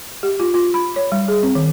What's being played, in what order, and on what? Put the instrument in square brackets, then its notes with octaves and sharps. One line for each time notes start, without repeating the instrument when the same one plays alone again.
[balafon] G4
F4
F4
B5
C#5
G3
G#4
C4
D#3